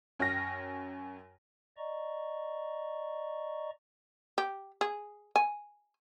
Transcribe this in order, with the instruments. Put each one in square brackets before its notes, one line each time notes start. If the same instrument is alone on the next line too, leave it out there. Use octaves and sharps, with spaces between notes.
[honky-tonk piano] F#2 C#5 G5 F6 A#6
[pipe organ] D5 D#5 A#5 C#6
[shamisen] G4
G#4
G#5